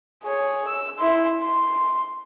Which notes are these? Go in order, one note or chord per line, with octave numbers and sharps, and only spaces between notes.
G#4 C#5
E6
E4 C6
C6